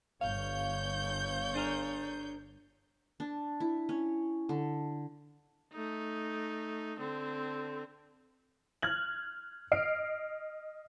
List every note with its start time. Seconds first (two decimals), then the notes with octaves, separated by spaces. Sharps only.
0.21 G1 C#5 F5 G6
1.54 D4 G#4 A#4
3.20 D4
3.60 E4
3.89 C#4
4.49 D3
5.73 A3 D#4
6.99 D3 C4
8.82 F6 F#6 G#6 F#7
9.72 D#5 F6 C7 D7